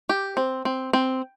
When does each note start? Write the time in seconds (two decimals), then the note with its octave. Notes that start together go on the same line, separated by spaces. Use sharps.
0.09 G4
0.37 C4
0.65 C4
0.93 C4